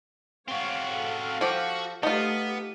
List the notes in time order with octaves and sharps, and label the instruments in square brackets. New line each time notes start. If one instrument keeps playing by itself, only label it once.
[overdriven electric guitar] C4 F#4 [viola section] C#5 F5
[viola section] A4 F5
[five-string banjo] F3 G4 [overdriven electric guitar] F#4
[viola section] A3 G4 [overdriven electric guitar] B3 [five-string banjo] D#4 F4